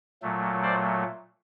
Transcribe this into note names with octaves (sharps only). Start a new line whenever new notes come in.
A#2 F#3 A3
C5 D5